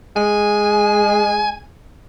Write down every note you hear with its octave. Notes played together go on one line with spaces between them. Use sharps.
G#3 G#5